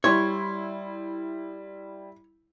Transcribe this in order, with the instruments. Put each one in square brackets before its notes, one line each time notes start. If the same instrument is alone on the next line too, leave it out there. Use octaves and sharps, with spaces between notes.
[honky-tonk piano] G3 C6 [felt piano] E4 [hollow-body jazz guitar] C#5